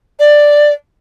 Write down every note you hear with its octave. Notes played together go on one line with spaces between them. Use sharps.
D5